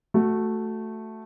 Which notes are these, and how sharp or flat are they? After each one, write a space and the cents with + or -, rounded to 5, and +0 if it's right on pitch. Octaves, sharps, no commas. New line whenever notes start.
A3 +0 F#4 +0